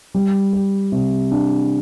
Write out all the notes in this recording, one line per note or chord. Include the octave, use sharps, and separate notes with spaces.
G3
G4
C3
D4